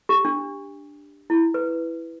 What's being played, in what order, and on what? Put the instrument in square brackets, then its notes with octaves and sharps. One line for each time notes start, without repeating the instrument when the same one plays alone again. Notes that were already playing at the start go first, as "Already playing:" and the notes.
[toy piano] G4
D4
E4
B4